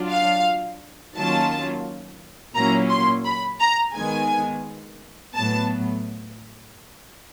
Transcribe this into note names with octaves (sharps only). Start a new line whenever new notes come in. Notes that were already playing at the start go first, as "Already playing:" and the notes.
Already playing: F#3 D4 F4
F5
D#3 F#3 A#3 C#4 F4 A5
A#2 F#3 A#3 C#4 E4 A#5
C6
B5
A#5
D#3 G#3 B3 G#5
A2 F#3 B3 A5